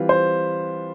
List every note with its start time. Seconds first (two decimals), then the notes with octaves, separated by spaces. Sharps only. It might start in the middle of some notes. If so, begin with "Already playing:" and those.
Already playing: E3 G3 C4 F4 B4
0.09 C5